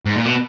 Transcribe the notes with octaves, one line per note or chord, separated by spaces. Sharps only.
G#2
A#2
B2